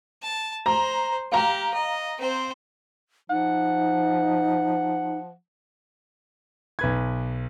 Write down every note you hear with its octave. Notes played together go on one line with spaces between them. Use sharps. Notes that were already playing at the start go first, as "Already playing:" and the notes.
A5
C5 A#5
G4 F5 A#5
D#5
C4 C5
F3 D#4 F#5
B1 B4 G#6